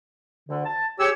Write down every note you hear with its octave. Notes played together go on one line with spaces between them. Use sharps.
D2 D3
A5
G4 G#4 C#5 E6